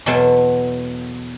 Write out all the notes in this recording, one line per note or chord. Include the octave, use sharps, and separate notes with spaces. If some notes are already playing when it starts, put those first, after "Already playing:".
E2 B2 F#3 A3 A5 C6